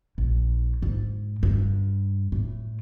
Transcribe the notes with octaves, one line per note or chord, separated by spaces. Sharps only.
A#1
G#2
G2
A2